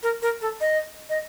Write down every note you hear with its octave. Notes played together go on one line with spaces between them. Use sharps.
A#4
A#4
A4
D#5
D#5